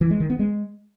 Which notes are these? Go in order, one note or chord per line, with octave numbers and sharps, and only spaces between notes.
E3
G#3
D#3
B3
G#3